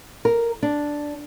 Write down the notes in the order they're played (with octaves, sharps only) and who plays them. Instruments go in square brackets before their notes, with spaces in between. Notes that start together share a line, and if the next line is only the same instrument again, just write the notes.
[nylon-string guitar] A#4
D4